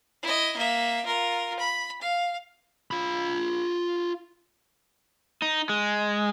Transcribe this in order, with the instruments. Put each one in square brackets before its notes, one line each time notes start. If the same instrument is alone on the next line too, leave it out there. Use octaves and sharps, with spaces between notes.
[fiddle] E4 D#5
A#3 E5
F4 A#4
B5
F5
[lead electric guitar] F4 B5
[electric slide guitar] D#4
G#3